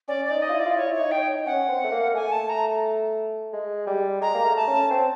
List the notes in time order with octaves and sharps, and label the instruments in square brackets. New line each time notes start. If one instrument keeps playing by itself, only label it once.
[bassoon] C#4 [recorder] D5
[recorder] D5
[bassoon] D#4
[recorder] D#5
[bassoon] F4
E4
[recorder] D5
[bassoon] F4
[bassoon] E4 [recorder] C#5
[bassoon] E4 [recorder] C#5
[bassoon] D#4
[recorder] G5
[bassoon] D#4
[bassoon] C#4 [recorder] F#5
[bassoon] C4
A3
A#3
[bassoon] A3 [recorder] G#5
[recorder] A5
A#5
[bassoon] G#3
G3
[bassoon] G#3 [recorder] A#5
[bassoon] A#3
A3
[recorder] A5
[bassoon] C#4
C4